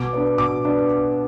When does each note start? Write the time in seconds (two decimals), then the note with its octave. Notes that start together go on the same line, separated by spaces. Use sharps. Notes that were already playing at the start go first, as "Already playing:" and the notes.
Already playing: B2 D6
0.13 B3 D4
0.38 B2 D6
0.65 B3 D4